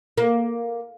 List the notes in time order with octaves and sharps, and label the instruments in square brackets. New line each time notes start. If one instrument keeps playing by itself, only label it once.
[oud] A#3